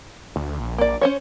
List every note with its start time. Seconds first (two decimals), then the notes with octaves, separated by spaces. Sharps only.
0.36 D2
0.60 A#1
0.78 A#3 D5
1.01 C#4 C5 C#5